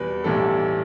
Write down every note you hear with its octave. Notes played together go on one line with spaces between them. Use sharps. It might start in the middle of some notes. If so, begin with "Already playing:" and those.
Already playing: E2 B2 G3 B4
B1 A2 E3 G3 A4